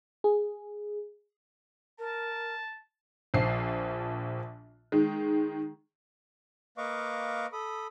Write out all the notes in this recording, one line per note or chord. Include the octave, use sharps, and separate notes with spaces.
G#4
A#4 A5
A#1 F3 C7
D#3 G#3
A#3 B4 D#5 F5 C#6 D6
A4 B5 D#6